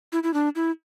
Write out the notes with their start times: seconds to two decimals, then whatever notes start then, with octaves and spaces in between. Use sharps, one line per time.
0.13 E4
0.23 E4
0.34 D4
0.56 E4